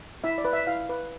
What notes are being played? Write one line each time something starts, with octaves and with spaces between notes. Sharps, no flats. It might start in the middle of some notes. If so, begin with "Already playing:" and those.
E4 E5
D5
B4
E5
E4 F5
B4